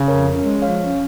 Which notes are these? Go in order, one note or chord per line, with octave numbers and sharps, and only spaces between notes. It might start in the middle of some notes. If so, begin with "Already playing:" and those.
Already playing: C#3
F2 A#4 C#5
C#4
G#3
F3 C#5 F5
C#4